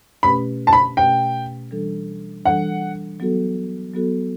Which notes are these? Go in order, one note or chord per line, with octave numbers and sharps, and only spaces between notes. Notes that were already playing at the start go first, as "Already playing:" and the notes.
B2 A3 C#4 G4 B4 B5
A5
B5
B2 A3 C#4 G4 B4 G5
E3 G3 D4 A4
E3 G3 D4 A4 F#5
F#3 B3 F#4 A4
F#3 B3 F#4 A4